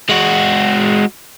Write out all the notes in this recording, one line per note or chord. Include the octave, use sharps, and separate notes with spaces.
G#3 F#4